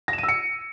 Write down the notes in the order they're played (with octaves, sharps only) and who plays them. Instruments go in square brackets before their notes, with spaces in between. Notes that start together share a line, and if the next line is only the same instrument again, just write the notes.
[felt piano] A#6
E7
D#7
E6
C#7